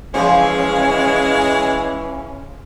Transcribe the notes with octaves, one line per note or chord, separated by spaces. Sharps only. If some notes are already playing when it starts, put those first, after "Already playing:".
C#3 E3 F3 G#3 C#4 C5